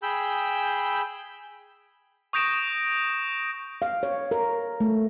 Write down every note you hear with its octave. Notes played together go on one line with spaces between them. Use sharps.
G#4 G5 B5 E6 G6
C#6 D#6 G6 A#6 D7 E7
F5
C#5
A#4
A3